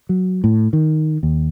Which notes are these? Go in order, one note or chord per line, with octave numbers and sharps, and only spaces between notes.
F#3
A2
D#3
D#2